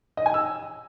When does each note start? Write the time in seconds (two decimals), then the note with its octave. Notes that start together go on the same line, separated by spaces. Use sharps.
0.17 D#5
0.26 G#5
0.34 E6